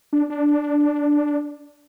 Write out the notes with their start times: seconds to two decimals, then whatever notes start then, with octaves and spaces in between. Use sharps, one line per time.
0.13 D4
0.30 D4